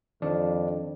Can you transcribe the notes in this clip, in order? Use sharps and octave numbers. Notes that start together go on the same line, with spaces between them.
F2 D#3 D4 D5